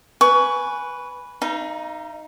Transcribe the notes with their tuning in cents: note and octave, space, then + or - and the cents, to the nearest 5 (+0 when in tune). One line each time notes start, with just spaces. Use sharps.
B4 +0 G#5 +0 C#6 +20
D#4 +0 F5 -40 A#5 +35